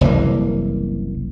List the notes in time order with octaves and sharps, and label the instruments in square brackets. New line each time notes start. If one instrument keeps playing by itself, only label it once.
[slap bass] F#1 C2 E3 A#3